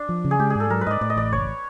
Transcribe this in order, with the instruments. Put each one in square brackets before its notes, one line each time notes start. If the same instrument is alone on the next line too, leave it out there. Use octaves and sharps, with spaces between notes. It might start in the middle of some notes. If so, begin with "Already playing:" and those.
Already playing: [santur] D4
[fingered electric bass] F3
C#3
[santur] G#4
[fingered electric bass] G#3 [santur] G4
[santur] G#4
[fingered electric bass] G#2 [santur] A4
[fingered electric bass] F#3 [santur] A#4
[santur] B4
[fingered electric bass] G#2 [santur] D5 D#5
[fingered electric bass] A2 [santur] D5
[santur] D#5
[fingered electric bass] A1 [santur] D5
[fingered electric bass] F#1 [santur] C#5